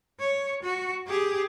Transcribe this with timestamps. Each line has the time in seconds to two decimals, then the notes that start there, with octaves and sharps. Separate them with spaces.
0.20 C#5
0.62 F#4
1.07 G4 G#4